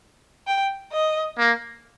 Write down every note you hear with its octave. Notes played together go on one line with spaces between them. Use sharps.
G5
D#5
A#3